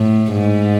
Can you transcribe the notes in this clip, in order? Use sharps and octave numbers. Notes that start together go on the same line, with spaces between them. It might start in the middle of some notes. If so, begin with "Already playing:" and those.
Already playing: A2
G#2